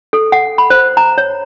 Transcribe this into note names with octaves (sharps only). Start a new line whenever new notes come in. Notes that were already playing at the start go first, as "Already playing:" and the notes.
A4
F#5
B5
C5
A#5
C#5